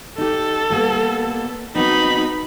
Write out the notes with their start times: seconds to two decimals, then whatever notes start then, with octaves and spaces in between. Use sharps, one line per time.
0.18 D#4 G4 A4
0.70 G3 A#3 B3
1.75 F#3 B3 C4 D#4 B5